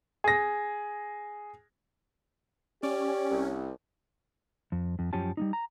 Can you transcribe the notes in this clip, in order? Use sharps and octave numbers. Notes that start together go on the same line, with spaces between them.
G#4 A#6
C#4 G4 D5
C2
F2
F2
F#2 F3 C#4 G4 A5
G3 A#3 D#4
A#5